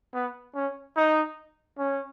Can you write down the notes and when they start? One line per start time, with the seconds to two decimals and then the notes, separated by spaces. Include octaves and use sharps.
0.15 B3
0.55 C#4
0.96 D#4
1.78 C#4